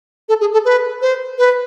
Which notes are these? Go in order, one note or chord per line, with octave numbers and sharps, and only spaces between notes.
A4
G#4
A4
B4
C5
B4